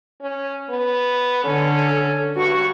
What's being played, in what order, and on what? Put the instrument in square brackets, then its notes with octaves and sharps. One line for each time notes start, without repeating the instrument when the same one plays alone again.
[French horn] C#4
B3
[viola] D3 A4 [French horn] C#4
[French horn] G2 [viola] F#4 C#6